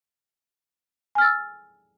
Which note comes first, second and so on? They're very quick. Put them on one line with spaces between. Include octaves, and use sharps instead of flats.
G#5 F6 A6 E6